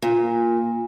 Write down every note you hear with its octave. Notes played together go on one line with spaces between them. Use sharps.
A#2